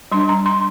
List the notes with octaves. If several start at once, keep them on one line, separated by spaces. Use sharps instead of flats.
G3 D4 C6
A#5
C6